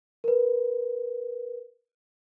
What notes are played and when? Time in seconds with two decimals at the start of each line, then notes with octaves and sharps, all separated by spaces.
0.24 A#4 B4